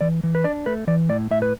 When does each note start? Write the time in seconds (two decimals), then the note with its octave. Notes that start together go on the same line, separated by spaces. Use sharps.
0.01 E3 D5
0.23 E3
0.35 B4
0.44 D4 D5
0.66 A3 B4
0.87 E3 D5
1.09 A2 D5
1.31 A2 E5
1.42 B4